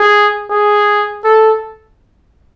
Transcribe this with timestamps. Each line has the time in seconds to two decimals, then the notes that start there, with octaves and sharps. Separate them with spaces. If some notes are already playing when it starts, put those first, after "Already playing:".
Already playing: G#4
0.50 G#4
1.24 A4